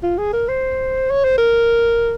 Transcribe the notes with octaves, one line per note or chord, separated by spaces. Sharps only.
F4
G#4
A#4
C5
C#5
C5
A#4